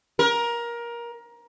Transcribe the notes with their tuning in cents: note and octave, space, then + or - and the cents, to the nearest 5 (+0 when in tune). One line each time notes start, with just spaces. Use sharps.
A#4 +20